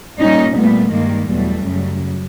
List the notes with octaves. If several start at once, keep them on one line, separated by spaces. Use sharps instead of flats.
A#2 G3 C#4 D#4
A#2 G3 A3 B3
G2 D#3 G3 G#3 A#3
E2 B2 F#3 G3 A3
F#2 C#3 F#3